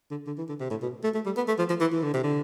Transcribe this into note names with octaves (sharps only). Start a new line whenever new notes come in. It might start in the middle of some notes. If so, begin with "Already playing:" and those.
D3
D3
E3
D3
C3
A2
B2
A3
A3
G3
B3
A3
F3
F3
E3
E3
D3
C3
D3